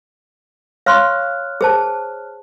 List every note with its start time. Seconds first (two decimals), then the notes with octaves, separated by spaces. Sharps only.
0.86 C#5 F5 C6 C#6 F6 F#6
1.61 G#4 C5 A5